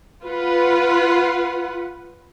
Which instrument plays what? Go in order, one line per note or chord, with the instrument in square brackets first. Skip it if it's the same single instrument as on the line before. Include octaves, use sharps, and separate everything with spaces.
[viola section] F4 B4 F#5